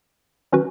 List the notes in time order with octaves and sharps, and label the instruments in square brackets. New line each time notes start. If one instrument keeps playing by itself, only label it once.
[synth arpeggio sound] D#3 F#3 C#4 F#4 B4